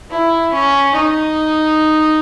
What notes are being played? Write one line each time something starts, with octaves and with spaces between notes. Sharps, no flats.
E4
C#4
D#4